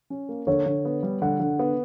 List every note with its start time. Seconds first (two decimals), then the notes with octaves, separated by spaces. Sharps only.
0.10 C#4
0.29 A#3
0.47 D3 C#5
0.66 D3
0.85 B3
1.03 G3
1.22 D3 F#5
1.40 D3
1.59 B3